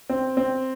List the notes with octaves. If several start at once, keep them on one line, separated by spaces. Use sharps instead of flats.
C4
C4